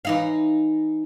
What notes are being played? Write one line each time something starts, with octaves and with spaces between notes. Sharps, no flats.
E3 D#4 F5